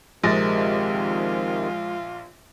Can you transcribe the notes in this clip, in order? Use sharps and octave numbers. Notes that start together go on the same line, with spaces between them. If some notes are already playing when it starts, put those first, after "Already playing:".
A#1 C3 D#3 G#3 A6 A#6
F4